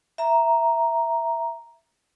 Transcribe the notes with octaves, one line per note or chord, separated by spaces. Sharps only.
E5 A#5